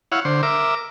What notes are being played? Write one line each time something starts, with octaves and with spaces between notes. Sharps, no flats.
E4 C#5 F5 F#5
D3 C5
A#4 E5 D6